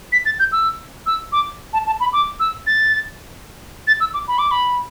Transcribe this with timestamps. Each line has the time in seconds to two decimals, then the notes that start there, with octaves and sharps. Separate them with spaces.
0.12 B6
0.25 A6
0.39 G6
0.52 E6
1.06 E6
1.32 D6
1.73 A5
1.86 A5
2.00 B5
2.13 D6
2.40 E6
2.67 A6
3.87 A6
4.00 E6
4.14 D6
4.28 B5
4.38 D6
4.51 B5